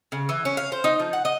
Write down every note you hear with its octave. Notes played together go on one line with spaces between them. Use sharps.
C#3
E3
C#4
F5
C5
D#4
F3
F#5
D#5